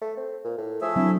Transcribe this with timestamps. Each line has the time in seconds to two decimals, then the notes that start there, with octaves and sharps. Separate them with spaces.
0.02 A3
0.17 C4
0.44 A#2
0.58 A2
0.81 F3 A3 G#4 E5
0.96 F#3 C4 D4 E4